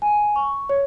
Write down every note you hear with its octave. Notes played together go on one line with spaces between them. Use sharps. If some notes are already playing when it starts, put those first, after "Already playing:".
G#5
C#6
C#5